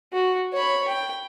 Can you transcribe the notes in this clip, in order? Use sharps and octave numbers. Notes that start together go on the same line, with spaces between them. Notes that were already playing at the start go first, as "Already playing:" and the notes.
F#4
C#5 B5
G5